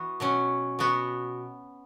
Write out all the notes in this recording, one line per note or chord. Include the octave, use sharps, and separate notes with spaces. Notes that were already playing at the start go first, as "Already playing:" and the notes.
Already playing: E3 B3 F#4
B2 F#3 C#4
B2 B3 F#4